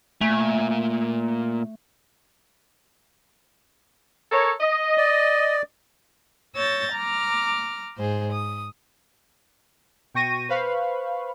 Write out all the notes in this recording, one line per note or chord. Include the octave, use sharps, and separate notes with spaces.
A#2 A3 G#5
A4 A#4 C#5
D#5
D5
C#5 E6 G6 A6 A#6
A#5 D6 F6
G#2 G#4 C5
D#6
B2 G5 C#6 A#6 D#7
B4 C5 F5 B5 C#6